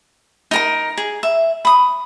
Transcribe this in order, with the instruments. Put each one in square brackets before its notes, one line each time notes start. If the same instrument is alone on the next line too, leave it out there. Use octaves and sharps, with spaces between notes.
[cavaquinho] D#4 A#4 A#5
G#4
E5
B5 D#6